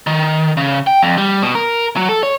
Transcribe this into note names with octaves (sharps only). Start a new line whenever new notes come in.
D#3
C#3
G5
F2
G3
B2
A#4
F#3
A4
C#5